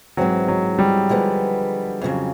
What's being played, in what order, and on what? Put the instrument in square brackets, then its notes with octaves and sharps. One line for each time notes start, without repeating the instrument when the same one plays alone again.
[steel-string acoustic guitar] G#2 E3 G#3 C4 [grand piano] F#3
[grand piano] F#3
G3
[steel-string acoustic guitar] D3 F3 G#3 B3
F2 C#3 F#3